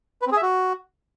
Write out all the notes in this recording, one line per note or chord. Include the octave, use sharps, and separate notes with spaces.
B4
C4
G#4
E5
F#4